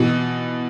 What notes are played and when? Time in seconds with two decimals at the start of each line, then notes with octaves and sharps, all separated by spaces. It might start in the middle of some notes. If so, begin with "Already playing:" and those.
Already playing: B2 E3